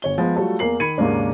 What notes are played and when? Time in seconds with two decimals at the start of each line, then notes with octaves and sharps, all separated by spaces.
0.02 G1 C#5 G7
0.18 F3 G#3 B3
0.36 F#3 G3 A3 F4 A4
0.59 E2 A#3 A#4 C7 F#7
0.80 D#3 B5 G#6 C#7 D#7
0.98 D#2 G#2 C#3 A#3 D4